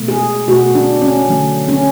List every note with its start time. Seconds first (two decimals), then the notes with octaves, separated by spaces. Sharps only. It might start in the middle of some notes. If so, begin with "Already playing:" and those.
Already playing: B2 A3
0.08 G#4
0.47 B2 A3 F#4
0.75 D4
1.02 C#4
1.27 D3 F#3 A3
1.68 C#4